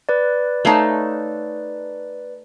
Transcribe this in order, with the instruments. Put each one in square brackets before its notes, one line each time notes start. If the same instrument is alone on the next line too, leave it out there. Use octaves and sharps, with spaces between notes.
[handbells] B4 D5
[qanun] A3 D#4 [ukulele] C#5 F5 A5